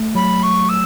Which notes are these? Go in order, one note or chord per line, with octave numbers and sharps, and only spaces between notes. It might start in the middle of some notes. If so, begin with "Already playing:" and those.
Already playing: A3
F#3 B5
C#6
E6